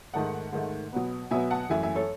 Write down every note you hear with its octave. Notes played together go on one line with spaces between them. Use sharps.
G#2 D#3 A3 F#5 A5
G#2 D#3 A3
B2 F#3 B3
B2 F#3 B3 E5 G#5
F#5 A5
F#2 E3 A3 E5 G#5
E5 G#5
A4 C#5